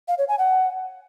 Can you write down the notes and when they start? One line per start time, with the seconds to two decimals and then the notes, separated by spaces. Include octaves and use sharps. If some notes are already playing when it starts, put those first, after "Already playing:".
0.08 F5
0.18 C#5
0.28 G#5
0.39 F#5